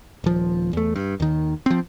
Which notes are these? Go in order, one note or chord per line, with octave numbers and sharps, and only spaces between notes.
D#1 F3
E2 A3
G2
D#2 D#3
F3 C4